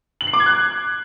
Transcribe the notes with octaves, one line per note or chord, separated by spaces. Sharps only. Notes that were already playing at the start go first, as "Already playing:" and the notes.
F#7
C7
D6
G#6
F#6